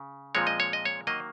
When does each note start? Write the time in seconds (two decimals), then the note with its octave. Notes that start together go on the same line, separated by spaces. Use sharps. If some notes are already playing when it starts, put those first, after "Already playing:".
Already playing: C#3
0.35 A#2 F3 G#3 C4 C#5
0.47 D#5
0.60 C#5
0.73 D#5
0.85 C#5
1.07 D#3 F#3 A#3 D#5